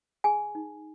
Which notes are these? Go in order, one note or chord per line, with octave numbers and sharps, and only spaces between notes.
G#4 G#5
D#4